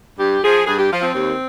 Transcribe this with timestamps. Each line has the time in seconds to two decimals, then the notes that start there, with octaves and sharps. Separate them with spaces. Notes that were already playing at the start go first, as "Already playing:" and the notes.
0.18 G2 G4
0.43 F3 G#4
0.67 G2 G#4
0.78 G4
0.91 F3 F4
1.03 C4
1.14 D#2